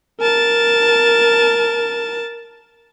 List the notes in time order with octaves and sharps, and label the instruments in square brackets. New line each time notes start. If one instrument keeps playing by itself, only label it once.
[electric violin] A#4 A5